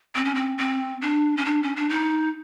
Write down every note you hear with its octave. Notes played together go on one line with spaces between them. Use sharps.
C4
C#4
C4
C4
D4
C#4
D4
C#4
D4
D#4